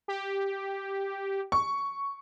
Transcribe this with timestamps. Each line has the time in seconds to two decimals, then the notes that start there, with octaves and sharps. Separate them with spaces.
0.08 G4
1.52 C#6